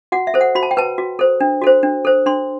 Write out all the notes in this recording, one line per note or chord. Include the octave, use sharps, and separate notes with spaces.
F#4 F#5
E5
A4 C5
F#5
F#4 B5
A5
G5
B4 A5
F#4
A4 C5
D4
F#4 A4 C5
D4
A4 C5
D4 C6